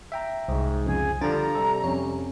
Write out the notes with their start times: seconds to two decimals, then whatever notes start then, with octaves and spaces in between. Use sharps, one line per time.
0.12 E5 G5 A#5
0.48 C2 G#2
0.86 F2 C#3 F3 G#4
1.22 D3 F3 G3 D4 A4 A#5 A6
1.55 C3 G3 A4
1.84 F2 C#4 C#5